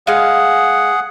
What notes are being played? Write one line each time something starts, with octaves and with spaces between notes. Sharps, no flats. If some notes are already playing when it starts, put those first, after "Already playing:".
G#3 G#4 F5 F#5